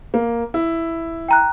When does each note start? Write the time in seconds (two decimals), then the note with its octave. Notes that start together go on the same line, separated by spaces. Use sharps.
0.14 A#3
0.54 E4
1.29 G5 A#5 F#6